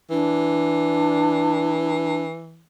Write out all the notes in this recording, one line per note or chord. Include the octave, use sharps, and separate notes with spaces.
E3 D4